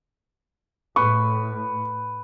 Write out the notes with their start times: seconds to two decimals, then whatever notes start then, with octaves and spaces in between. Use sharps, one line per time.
0.96 A2 B4 C#6